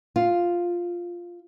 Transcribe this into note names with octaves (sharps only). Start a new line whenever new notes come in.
F4